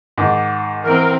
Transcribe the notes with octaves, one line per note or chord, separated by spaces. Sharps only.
G#2 D#3 F#5 D6
E3 C4 A#4